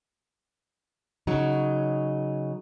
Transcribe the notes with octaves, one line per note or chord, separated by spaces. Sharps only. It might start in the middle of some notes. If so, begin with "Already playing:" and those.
C#3 F#3 D#4